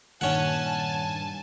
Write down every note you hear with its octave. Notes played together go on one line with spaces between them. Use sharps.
G2 A#2 D#3 G3 C#4 F#5 G#5 A5